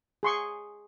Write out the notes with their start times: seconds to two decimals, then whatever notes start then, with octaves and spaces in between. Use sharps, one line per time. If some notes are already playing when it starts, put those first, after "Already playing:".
0.23 G#4 C6 C#6